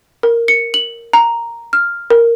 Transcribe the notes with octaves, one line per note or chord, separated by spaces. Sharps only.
A#4
C#7
F#7
A#5
F6
A#4